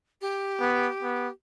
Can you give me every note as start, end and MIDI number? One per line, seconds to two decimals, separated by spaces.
0.22 1.31 67
0.61 0.88 59
1.03 1.28 59